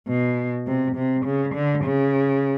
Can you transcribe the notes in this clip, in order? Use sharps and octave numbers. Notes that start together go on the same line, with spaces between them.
B2
C3
C3
C#3
D3
C#3